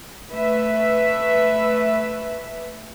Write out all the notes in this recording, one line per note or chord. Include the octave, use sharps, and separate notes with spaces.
A3 B4 E5